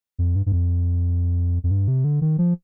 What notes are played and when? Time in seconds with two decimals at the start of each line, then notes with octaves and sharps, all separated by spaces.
0.19 F2
0.36 G2
0.46 G2
0.52 F2
1.64 F2
1.71 G2
1.88 C3
2.04 D3
2.21 D#3
2.38 F3